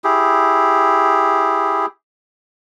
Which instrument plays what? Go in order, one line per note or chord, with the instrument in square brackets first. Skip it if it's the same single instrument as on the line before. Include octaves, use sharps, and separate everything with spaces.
[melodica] E4 G4 G#4